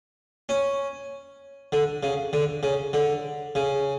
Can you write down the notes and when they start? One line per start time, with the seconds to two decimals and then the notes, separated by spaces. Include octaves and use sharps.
0.49 C#4
1.72 D3
2.03 C#3
2.33 D3
2.63 C#3
2.93 D3
3.55 C#3